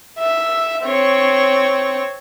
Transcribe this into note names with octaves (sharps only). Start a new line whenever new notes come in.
E5
C4 C#5